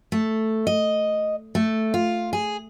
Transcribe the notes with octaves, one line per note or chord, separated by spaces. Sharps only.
A3
D#5
A3
F4
G#4